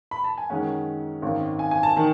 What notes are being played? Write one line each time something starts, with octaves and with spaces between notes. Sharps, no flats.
B5
A5
G#5
F#2 D#3 G#3 C#4 F#5
G#1 F#2 D#3
G#5
G#5
A5
D#3